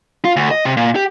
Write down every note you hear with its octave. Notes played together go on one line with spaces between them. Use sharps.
F4
D2
D#5
C3
A#2
G4